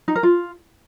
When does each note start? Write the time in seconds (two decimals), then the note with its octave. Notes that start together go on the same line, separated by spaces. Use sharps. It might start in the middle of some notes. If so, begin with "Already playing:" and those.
0.08 D#4
0.15 A#4
0.23 F4